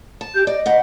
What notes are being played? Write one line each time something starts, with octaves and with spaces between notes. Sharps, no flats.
A5
G4 G6
D5 D#5
D2 F#5 G5